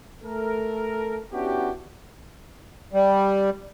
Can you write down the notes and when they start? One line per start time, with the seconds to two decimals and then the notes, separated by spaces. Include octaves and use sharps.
0.23 A3 A4 A#4
1.33 B3 C#4 D4 E4 F#4 G4
2.93 G3